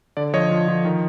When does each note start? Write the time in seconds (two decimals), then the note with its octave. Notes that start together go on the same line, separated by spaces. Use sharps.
0.17 D3 D5
0.33 F3 C#5 D#5
0.51 F3
0.68 F3
0.85 D#3